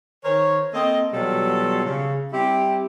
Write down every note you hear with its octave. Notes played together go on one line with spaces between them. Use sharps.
D#3 A#4 C5 C#5
A#3 C4 A4 D#5
B2 E3 F#3 G3 F4 A4
C#3
G3 C4 E4 G4